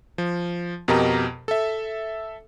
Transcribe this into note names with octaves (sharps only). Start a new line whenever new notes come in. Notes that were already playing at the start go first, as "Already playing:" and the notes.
F3
F2 B2 G4 A#4 D#5 A#5
A4 E5